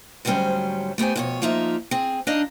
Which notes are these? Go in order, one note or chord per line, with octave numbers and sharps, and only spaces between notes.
D2 G#2 F#3 G3 C#4 C5
A3 B3 G4 C5 G#5
F2 B2 C#5
F3 A#3 D#4 F4 E5
C4 G#4
D4 D#4 D#5 F5